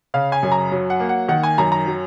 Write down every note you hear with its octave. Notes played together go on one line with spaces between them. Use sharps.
C#3 F5
G#5
F#2
A#5
F#3
F#5
A#3
F#5
D#3 F#5
G#5
F#2 A#5
A#5
F#3